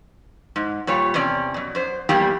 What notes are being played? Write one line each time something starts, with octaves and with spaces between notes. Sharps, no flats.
G#2
A#2 G3 C#5
E2 C3 C#4 D5
F#2 B2
F#2 C5
E2 G3 A#3 E4 G4